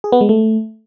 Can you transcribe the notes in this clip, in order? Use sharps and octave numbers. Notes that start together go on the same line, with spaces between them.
G#4
B3
G#3
A3